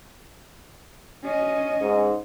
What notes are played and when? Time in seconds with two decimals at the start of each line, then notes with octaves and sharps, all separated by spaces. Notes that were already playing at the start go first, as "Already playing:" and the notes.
1.23 C#4 D#5
1.81 G#2